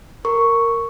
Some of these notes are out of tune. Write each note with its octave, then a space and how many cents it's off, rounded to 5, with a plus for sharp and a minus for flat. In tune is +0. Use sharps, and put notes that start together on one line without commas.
A#4 -10 C#6 +0